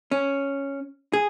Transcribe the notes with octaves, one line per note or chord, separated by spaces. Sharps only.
C#4
G#4